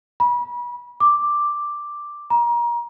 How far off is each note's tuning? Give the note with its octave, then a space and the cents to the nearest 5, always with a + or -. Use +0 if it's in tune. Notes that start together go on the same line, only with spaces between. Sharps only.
B5 -35
D6 +5
A#5 +30